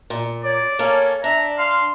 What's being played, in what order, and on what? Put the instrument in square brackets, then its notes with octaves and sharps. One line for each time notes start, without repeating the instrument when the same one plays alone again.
[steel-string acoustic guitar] A#2
[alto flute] C#5 [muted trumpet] D5
[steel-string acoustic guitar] A#3 C#4 A4 [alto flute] C#5
[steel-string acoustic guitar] D4 [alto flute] E5 [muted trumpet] A#5
[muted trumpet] F5 [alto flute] C6